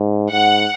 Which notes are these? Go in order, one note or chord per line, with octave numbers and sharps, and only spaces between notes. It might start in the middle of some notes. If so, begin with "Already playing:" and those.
Already playing: G#2
G#2 F#5